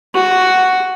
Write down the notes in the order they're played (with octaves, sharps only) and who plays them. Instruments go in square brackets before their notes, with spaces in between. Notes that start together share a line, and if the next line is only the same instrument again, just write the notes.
[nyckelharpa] F#4